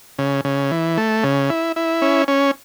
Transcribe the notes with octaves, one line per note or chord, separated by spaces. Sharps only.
C#3
C#3
E3
A3
C#3
E4
E4
C#4
C#4